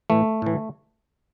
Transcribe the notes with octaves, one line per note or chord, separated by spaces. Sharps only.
A2 E3 A3
A2 E3